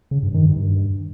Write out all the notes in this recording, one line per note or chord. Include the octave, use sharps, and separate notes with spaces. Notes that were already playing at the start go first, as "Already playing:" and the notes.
C#3
G2
D#3
G2